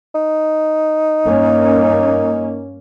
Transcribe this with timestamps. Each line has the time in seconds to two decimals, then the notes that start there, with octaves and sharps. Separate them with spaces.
0.15 D#4
1.26 G2 A#3 C#4